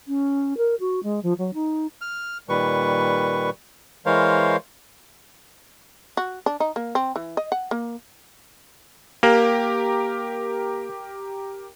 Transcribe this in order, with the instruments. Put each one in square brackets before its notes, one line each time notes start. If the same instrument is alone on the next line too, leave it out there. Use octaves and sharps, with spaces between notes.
[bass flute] C#4
A#4
F#4
G#3
F3
F#3
D#4
[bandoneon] F6
A#2 D#3 G3 B4 C#6
E3 G#3 A#4 C5 C#5 F5
[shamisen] F#4
D4
D#4
A#3
C4
E3
D#5
F#5
A#3
[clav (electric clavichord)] A#3 [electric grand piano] G4 A#4